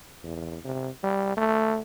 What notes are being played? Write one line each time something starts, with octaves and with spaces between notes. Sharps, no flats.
E2
C3
G3
A3